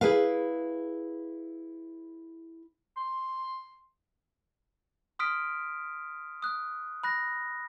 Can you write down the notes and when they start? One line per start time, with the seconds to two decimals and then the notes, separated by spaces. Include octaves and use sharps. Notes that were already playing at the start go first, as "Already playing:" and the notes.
0.01 E4 G#4 B4 F5
2.97 C6
5.19 C6 D#6 F6 B6 D7
6.42 D#6 F#6
7.03 B5 F#6 A#6